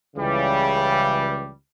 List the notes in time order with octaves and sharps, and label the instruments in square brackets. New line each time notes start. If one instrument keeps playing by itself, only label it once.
[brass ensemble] C#2 C#3 E3 G3